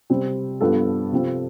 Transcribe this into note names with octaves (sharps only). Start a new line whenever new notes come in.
C3 G3 C4
G2 F3 B3 A4
C3 F3 C4